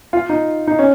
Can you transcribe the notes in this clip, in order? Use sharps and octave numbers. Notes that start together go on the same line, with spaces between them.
F4
D#4
D#4
C#4